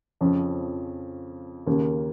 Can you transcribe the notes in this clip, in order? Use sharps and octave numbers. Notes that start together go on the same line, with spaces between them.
F2 C#3 F3 C#4
D#2 C#3 A#3